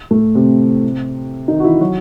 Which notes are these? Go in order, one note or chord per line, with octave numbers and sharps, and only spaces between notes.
A2 A3
C3 C4
D#3 D#4
F#4
E3 E4
F#3 F#4